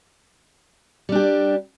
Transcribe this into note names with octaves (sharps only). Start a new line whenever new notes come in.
G3 D4 G4